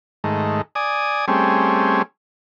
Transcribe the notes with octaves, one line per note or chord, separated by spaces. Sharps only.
G#2 D#3 A3
D5 G#5 D#6
G3 A3 C4 C#4 G#4